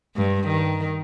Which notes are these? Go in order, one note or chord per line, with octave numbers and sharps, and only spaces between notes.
G2
D#3